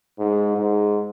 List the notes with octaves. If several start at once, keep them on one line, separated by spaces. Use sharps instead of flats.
G#2
G#2